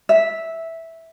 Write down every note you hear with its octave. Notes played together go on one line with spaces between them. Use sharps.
E5